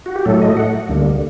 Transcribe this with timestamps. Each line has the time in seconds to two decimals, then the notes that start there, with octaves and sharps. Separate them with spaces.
0.06 F#4
0.16 G4
0.25 A2 F#3 A3 A4
0.42 D#5
0.57 F#5
0.89 D2 D3 G3 A#3